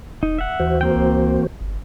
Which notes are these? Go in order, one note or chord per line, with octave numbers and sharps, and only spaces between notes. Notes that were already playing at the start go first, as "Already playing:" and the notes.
E1 D#4
E5 F#5
D#2 E3 F#4 C5
A#3 C4 G5
C#2
G1